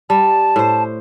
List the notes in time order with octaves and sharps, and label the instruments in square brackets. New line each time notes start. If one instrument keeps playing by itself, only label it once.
[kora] G3 [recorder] A5
[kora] A2 C5